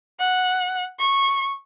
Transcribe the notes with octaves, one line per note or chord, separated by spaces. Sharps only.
F#5
C#6